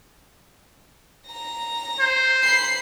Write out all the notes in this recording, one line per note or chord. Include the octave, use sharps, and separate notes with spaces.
A#5 A#6
C5
B5 C7